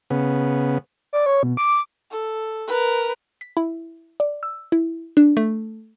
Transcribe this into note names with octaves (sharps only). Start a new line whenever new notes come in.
C#3 B3
D5
C#5
B2
D6
A4
A#4 B4
B6
E4
D5
E6
E4
D4
A3